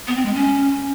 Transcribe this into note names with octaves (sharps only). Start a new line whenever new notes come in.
B3
C4
G#3
C#4